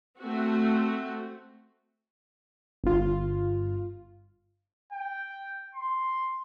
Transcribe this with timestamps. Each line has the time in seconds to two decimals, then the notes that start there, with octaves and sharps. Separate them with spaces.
0.20 A3 C4 F#4
2.84 G1 F4
4.93 G5
5.75 C6